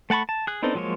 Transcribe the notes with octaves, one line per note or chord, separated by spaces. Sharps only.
A3 F#5 A5 B5 C#6
A5
G#4 F#6
B3 C4 D4 D#4 A4
F3 F#3 G#3 A#3 C#5